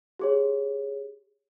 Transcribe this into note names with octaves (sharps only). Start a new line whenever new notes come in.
G4 G#4 C#5